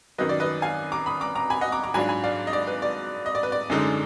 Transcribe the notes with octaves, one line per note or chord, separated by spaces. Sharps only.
F#2 D#3 F#3 B4 D#5
D5
B4 D#5
F5 G#5
A#5 D6
B5 D#6
A#5 D6
A#5 D6
G#5 B5
D#5 F#5
A#5 D6
A#5 D6
G#2 F#3 D4 F4 G#5 B5
G#5 B5
D5 F5
D#5
D5
B4
D5
D#5
D5
B4
D5
F#2 D3 G#3 D#4